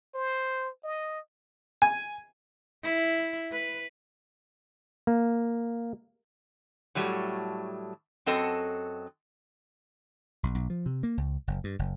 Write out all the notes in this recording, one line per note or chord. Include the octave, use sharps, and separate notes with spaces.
C5
D#5
G#5
E4
B4
A#3
A2 F#3 G3 A3
F#2 F#3 C4 A4 D#5
B1
B1
F3
C3
A#3
C#2
F#1
G2
F#1